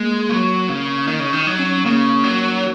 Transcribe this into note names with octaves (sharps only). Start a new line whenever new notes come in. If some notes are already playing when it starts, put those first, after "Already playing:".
Already playing: G#3 A#3
F#3 A#3
C#3
D#3 A#3
C#3
D#3 D#4
F#3
C#4
C#4
C#3 A#3
F#3